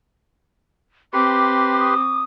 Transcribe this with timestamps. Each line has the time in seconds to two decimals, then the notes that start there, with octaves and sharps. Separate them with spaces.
1.13 C4 G4 B4 C6 D6
1.79 D#6